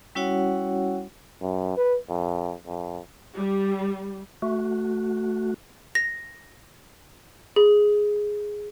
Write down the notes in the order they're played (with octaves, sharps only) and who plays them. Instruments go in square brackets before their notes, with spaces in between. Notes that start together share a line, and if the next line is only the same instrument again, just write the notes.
[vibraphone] G3 C#4 E4 F#4 C#5 F#5
[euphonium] F#2
B4
F2
F2
[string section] G3
[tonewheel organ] A3 F#4
[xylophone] A#6
G#4